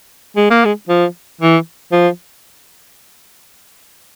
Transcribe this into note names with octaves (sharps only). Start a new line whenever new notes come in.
G#3
A#3
G#3
F3
E3
F3